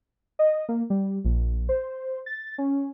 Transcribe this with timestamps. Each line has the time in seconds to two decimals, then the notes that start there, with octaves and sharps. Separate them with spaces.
0.39 D#5
0.69 A#3
0.90 G3
1.24 A#1
1.69 C5
2.26 A6
2.58 C#4